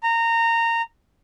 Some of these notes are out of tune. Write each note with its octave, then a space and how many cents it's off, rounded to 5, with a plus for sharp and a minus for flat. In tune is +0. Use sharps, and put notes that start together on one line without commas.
A#5 -20